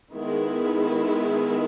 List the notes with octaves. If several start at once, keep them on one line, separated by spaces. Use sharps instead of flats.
D#3 G#3 B3 E4